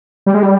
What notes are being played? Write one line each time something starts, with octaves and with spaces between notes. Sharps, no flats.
G3
G#3
G3